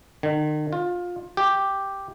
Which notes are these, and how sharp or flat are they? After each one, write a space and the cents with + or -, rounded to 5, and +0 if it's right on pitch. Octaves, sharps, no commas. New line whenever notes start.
D#3 -40
F4 +20
G4 +0